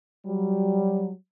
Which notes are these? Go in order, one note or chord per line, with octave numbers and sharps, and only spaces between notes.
F#3 G3